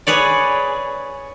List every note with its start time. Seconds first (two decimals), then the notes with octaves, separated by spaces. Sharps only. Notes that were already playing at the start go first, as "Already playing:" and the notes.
0.07 G#4 B4 C#5 D5